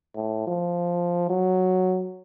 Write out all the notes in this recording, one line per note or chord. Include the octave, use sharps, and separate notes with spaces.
A2
F3
F#3